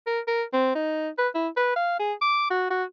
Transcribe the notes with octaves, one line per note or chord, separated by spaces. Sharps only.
A#4
A#4
C4
D#4
B4
E4
B4
F5
G#4
D6
F#4
F#4